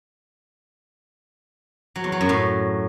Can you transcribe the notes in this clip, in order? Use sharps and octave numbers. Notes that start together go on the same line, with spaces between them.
F#3
E2
F#3
F#2
A2